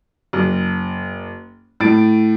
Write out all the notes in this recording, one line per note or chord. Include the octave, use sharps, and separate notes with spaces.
F#1
A2 A6 D7